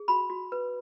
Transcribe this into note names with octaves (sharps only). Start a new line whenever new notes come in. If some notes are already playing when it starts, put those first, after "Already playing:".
Already playing: G#4
F#4 B5
F#4
B4